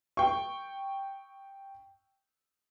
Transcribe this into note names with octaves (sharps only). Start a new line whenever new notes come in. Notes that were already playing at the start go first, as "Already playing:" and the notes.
G5 C#6